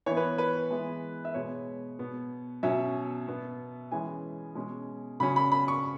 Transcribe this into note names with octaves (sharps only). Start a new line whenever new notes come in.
E3 B3 C#5
B4
B4
E3 G#3 B3
E5
B2 G#3 B3 C#5
B2 B3
B2 F#3 C#4 E5
B2 B3
E3 G#3 C#4 G#5
B2 G#3 C#4
C#3 F#3 C#4 B5
B5
B5
C#6